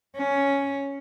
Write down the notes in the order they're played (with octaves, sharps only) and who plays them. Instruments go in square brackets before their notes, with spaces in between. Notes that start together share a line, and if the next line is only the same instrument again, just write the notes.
[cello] C#4